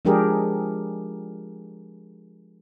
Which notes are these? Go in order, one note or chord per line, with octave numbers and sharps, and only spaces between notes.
F3 G#3 D4 G4 G#4 A#4